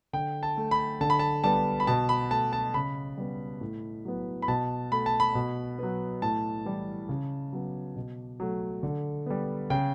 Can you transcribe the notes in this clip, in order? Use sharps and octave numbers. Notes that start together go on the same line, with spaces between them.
D3 G5
A5
A3
B5
D3 A5
B5
A5
G3 B3 A5
B5
B2 A5
B5
A3 A5
A5
C#3 B5
G3 B3
A2
F#3 B3
B5
B2 A5
A3 B5
A5
B5
B2
F#3 B3
A2 A5
E3 G3
C#3
F#3 B3
B2
F#3 A3
D3
G3 B3
C#3 G5